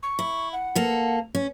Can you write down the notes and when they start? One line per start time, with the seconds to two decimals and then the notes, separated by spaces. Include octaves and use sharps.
0.03 C#6
0.19 E4
0.53 F#5
0.75 A#3 A4
1.35 C#4